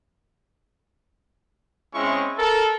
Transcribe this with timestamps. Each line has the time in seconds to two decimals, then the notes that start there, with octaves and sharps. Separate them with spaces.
1.94 G#3 C4 C#4 E4 C#6
2.38 A4 A#4